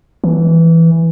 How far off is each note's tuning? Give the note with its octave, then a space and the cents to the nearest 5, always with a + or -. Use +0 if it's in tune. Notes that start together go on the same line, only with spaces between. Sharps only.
E3 +0